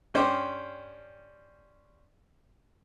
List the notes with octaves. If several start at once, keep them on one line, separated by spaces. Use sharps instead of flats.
G2 C#4 C5 G5 D6